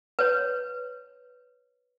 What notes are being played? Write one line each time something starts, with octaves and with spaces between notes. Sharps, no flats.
B4 C#5